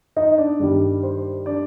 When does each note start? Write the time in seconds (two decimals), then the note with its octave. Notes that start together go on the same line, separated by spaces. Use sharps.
0.17 D#4 D#5
0.38 D4 D5
0.60 G2 D#3 G3
1.03 C5
1.46 D4 D5